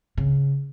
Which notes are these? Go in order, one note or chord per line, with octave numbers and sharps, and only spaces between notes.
C#3